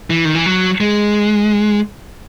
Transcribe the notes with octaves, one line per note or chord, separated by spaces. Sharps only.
E3
D#3
E3
F#3
G#3